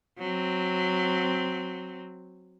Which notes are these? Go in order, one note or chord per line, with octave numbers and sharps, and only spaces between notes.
F#3 C4